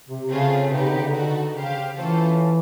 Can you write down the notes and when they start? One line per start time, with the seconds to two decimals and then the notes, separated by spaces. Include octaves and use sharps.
0.09 C3
0.29 C#3 A3 C4 F4 G#4 C#5
0.70 C3 B3 D#4 G4 B4
0.82 C#3
0.92 D3
1.02 C#3
1.12 D3 D#4 F#4 A4
1.54 C#3 G4 C5 F5
1.68 C#3
1.96 E3 A3 C#4 F4 A4 C5